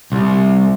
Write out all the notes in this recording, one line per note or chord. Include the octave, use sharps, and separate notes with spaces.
C2